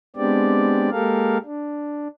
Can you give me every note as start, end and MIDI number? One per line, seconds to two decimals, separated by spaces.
0.16 0.90 56
0.16 0.90 59
0.16 0.90 60
0.16 0.90 62
0.16 0.90 67
0.16 0.90 74
0.91 1.38 56
0.91 1.38 58
0.91 1.38 67
0.91 1.38 69
0.91 1.38 70
0.91 1.38 77
1.45 2.08 62